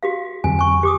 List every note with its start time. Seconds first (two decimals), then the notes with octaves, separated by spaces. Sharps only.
0.03 F#4 G4 F5
0.44 F2 D3 F#3 G#5
0.59 G#5 C#6
0.83 G4 D6 D#6